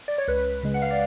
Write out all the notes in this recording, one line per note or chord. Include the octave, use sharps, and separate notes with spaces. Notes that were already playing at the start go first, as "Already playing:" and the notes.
D5
C#5
C#2 B4
C#3 G#3
F#5
F5
D5